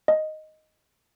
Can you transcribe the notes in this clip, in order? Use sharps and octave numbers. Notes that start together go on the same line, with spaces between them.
D#5